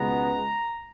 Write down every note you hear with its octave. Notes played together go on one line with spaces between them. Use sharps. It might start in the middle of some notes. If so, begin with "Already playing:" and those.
Already playing: C#2 B2 G#3 B3 A#5